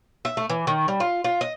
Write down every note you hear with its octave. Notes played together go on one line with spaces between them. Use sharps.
E5
A3
E3
D#3
G3
F4
F4
D#5